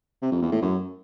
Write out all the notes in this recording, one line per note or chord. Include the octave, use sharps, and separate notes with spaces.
C3
F2
E2
A2
F#2